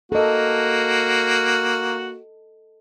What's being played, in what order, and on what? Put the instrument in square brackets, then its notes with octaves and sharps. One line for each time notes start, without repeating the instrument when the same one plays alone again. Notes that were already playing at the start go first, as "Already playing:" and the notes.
[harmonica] A#3 F#4 [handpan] A4 D#5